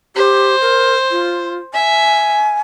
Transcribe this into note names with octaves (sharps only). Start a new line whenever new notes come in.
G4 C5
A#4
F4
E5 G#5